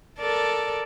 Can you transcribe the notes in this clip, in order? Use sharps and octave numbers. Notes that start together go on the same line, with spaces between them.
A4 A#4 D5